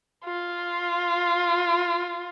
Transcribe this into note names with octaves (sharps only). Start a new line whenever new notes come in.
F4